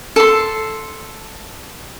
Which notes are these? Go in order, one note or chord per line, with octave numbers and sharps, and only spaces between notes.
A4 C6